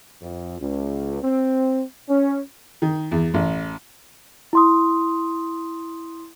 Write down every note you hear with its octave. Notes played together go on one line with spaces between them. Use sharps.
F2
C#2
C4
C#4
D#3
E2
A1
E4 C6 D#6